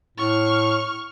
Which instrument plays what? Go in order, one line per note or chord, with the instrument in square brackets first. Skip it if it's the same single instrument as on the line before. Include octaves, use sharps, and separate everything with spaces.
[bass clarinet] A2 [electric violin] C#6 F6